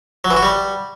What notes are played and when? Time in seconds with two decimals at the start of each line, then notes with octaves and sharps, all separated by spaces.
0.25 F#3
0.31 E3
0.37 F#4
0.43 G3